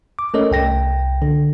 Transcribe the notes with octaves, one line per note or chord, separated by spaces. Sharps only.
D6
A3 C#4 A4 A#4 C#5 D#5
C2 G5 A#6
D3